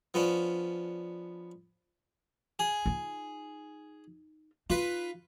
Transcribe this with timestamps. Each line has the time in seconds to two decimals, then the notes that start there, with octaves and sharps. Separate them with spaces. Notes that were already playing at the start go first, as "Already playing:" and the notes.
0.14 F3 B3 C#4 D4
2.59 G#4
2.86 D#4 F4
4.70 D#4 F4 B4